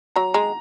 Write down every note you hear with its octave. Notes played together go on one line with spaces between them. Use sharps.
F#3 A#5
G#3 A#5